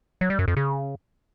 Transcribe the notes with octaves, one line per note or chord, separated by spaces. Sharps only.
F#3
G3
F#2
F2
C#3